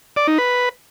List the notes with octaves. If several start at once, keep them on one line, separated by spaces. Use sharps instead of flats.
D5
D#4
B4